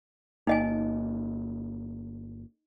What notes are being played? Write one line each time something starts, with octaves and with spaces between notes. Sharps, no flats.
G1 A#3 D#4 D#5 G#5